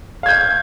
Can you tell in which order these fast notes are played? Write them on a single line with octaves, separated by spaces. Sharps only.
F5 G#6 G6